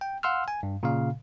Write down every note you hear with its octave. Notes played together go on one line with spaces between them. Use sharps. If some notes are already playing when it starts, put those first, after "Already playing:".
G5
F5 F#5 C6 E6 F6
G#5
G2
A#2 C#3 F5